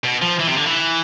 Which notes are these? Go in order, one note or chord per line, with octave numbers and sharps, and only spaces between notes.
B2
F3
E3
C3
D3
E3